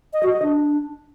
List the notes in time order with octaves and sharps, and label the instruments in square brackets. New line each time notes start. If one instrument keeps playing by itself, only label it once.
[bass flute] D#5
F#4
D#5
D4